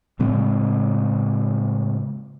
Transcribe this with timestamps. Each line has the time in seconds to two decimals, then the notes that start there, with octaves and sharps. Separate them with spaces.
0.19 A2 C#3 G#3 C4